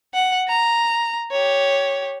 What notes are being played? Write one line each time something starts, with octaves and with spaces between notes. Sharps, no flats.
F#5
A#5
G4 C#5